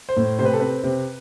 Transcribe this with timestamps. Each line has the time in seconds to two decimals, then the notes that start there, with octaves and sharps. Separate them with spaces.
0.09 C5
0.17 A2
0.39 C3 C5
0.45 B4
0.53 A4
0.60 C4 B4
0.84 C3